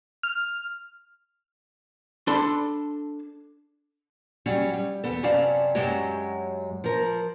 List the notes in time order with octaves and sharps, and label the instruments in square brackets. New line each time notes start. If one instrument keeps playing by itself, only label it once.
[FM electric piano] F6
[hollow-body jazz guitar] D4 A4 B5 C6
[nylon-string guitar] F#3 G3 C#4
G3
E2 B3 A4
F#2 C3 C#4 D5 F5 A5
F#2 F#3 G#3 G4 C#5
F3 A#4